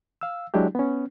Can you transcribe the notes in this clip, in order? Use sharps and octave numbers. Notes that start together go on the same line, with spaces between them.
F5 E6
F#3 G#3 D4 E4 G4
B3 C#4